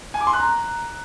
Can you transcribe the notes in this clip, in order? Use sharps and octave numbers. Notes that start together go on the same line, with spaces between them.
G#5
D6
C6
F#6
A#5